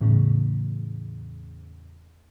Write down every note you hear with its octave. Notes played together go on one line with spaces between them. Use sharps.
E2 A2 C#3